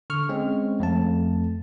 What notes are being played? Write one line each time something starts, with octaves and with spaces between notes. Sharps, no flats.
D3 C#6 F6
G#3 C4 C#4
F2 A3 A5